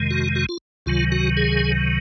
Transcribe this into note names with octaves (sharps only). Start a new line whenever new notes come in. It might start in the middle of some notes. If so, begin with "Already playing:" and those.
Already playing: F2 C3 D#3 G#3
F#4
F#4
F4
C#2 C3 D#3 F#3 F4
F#4
G#4